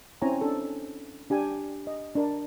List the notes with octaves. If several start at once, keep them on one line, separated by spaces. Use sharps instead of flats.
C4 C#4 E4 C#5 G#5 A#5
D4 A4
D4 G4 G#5
D#5
D4 A#4